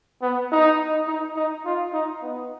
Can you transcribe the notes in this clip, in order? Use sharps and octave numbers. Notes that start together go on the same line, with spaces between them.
B3
D#4
D#4
D#4
F4
D#4
B3